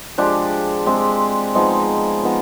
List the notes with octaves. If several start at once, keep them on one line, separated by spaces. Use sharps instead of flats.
F3 G#3 D4 G4
G#3 C4 G4
F3 G#3 B3 D#4
F3 B3 D#4